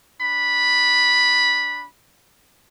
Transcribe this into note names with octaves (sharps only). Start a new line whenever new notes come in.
D4 B5